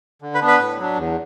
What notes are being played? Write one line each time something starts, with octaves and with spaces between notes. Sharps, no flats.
D3
B4 B5
B3 D4
B4 B5
A2
F#3 D4
E2